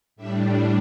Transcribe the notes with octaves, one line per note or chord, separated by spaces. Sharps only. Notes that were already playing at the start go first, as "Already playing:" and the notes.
A2 G3 D4 E5